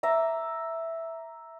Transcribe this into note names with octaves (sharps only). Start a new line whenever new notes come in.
E5 A#5 D6